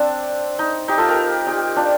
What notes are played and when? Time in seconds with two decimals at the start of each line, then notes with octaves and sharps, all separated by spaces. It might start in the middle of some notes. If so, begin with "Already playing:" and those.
Already playing: C4 D4
0.59 D#4
0.88 D#4 G4
0.98 F4 A4
1.08 G4 A#4
1.47 D#4 G4
1.76 D4 F4